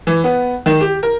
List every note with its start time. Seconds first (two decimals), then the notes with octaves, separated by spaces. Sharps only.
0.07 E3
0.24 B3
0.66 D#3
0.81 G4
1.03 A#4